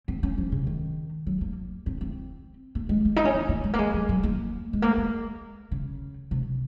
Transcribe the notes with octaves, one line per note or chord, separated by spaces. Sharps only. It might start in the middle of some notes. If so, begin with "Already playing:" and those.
C4
C#4
F3
C#3
D#3
F#3
A#3
C4
C4
A#3
G#3
A#3
D#4
C#4
C4
A#3
G#3
A#3
G#3
F#3
F#3
A#3
G#3
A#3
G#3
C#3
C3